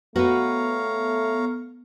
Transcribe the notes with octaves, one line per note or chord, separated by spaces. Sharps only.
A3 B3 F#4 B4 C#5 F5 A#5